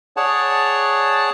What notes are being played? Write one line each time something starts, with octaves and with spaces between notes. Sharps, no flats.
G#4 C#5 D5 F#5 A5